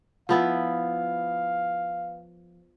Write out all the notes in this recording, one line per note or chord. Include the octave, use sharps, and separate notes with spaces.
F3 B3 E4 F5